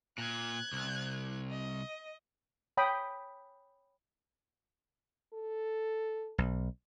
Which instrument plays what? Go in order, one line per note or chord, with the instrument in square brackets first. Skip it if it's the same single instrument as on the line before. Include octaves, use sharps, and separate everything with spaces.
[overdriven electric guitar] A#2 [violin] F#6 G#6
[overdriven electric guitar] C2
[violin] D#5
[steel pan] C#5 G5 B5 D#6
[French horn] A4
[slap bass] B1